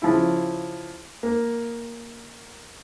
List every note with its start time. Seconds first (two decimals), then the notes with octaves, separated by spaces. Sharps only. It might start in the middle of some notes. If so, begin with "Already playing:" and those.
0.02 C#3 F3 E4
1.23 A#3